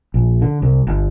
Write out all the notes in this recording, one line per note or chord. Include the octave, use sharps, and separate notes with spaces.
A#1
D3
C2
G1